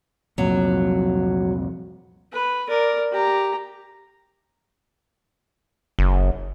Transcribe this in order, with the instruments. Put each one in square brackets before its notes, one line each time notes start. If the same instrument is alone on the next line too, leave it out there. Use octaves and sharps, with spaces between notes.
[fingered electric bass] C2 F2 A#2 [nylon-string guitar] F#3
[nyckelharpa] B4
A#4 D5
G4 A#5
[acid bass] F#1